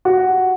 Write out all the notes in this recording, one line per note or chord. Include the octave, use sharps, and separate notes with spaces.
F#4